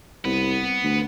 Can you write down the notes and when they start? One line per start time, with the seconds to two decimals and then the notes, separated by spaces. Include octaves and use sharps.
0.25 C2 B3 B4
0.83 D2